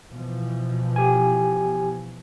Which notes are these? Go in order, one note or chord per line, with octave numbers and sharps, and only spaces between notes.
B2 E3 F3
G4 G#5